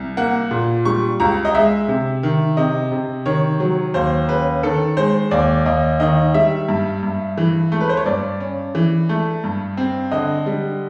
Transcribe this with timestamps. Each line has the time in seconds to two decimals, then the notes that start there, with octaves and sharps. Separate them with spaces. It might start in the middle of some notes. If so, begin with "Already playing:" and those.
Already playing: C2
0.17 A#3 F#5
0.51 A#2
0.85 G3 C#6
1.20 C#2 A#5
1.45 D#5
1.54 G#3 E5
1.88 C3
2.23 D#3
2.57 C3 D#5
2.92 C3
3.26 D#3 C#5
3.60 F#3
3.94 D#2 C5
4.29 C#4 B4
4.63 D#3 A4
4.97 G#3 C5
5.31 D#2 D5
5.66 D#2 D#5
6.00 D#3 D#5
6.34 G3 E5
6.69 G2
7.03 G2
7.38 E3
7.72 A3
7.80 B4
7.89 C5
7.97 C#5
8.06 G2 D5
8.40 C#4
8.75 E3
9.09 A3
9.44 G2
9.77 C4
10.11 D3 D#5
10.46 G3